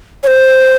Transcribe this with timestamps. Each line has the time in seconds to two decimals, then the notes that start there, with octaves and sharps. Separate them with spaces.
0.23 C#5
0.27 C5